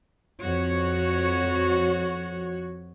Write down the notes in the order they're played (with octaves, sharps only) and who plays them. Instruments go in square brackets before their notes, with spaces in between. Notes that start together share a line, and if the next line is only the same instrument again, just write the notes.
[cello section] F2 F#4 C#5